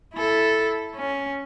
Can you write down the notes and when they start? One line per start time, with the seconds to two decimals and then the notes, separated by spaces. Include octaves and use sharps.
0.15 E4 A4
0.96 C#4